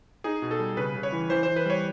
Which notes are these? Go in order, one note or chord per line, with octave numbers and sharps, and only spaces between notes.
D#4 G#4
B2
A4
G3
C#3 B4
C#3
C#5
E3
E3 C5
E3 C5
B4
G3 C#5